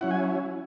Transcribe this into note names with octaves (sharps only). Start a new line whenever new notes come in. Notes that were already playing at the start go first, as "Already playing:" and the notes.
F#3 C#4 E4 F#5
G#5